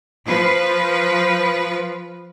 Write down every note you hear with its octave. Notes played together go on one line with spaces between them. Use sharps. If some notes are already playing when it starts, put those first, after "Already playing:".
F3 B4